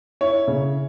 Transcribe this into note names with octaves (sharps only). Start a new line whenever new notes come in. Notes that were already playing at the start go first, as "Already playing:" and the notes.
E4 C#5
C#3